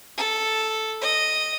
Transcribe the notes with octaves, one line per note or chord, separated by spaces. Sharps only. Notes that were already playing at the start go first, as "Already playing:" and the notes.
A4
D#5